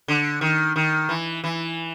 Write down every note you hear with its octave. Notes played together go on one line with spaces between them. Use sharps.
D3
D#3
D#3
E3
E3